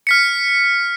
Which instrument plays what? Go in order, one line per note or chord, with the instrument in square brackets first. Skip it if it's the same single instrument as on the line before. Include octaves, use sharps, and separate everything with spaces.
[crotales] F6 B6 C#7